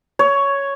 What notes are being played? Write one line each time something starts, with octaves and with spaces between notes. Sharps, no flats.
C#5